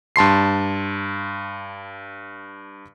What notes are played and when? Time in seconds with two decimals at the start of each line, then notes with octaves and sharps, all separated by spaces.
0.16 G2 A5 C6 C7